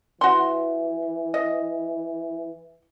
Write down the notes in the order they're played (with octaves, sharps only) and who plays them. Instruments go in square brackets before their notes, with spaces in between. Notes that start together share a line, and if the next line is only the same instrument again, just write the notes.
[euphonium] E3 [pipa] F#4 C6
[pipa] D#5